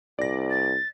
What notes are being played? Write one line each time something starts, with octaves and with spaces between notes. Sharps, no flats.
C2 D5 A#6
A6